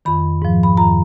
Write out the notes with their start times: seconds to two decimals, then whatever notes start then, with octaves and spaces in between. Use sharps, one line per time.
0.05 F2 D#3 B5
0.42 G#2 F3
0.63 B5
0.77 F2 D#3 A#5